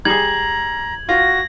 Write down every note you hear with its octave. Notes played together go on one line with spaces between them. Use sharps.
G3 G#4 A#5 G#6 F#7
F4 F#4 A#6